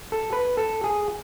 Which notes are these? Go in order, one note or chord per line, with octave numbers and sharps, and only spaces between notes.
A4
B4
A4
G#4